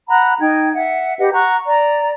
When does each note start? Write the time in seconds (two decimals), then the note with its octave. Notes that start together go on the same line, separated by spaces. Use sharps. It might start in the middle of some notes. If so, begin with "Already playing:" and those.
0.08 F#5 A#5 B5 F#6
0.40 D#4 G5 G#6
0.73 E5 F#5
1.18 G4 B4 D#5 F#5
1.33 F#5 A#5 C#6 F#6
1.67 D5 A#5